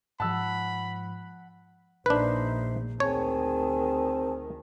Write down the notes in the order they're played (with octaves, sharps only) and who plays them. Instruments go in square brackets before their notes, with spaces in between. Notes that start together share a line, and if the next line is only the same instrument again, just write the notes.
[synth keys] G#2 F3 [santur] F#5 [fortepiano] A5 E6 [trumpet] B5
[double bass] A#1 [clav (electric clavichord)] D4 B4 [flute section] D#4 C5 E5
[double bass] D2 D#3 [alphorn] C4 [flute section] G#4 G#5 A5 [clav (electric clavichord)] C#5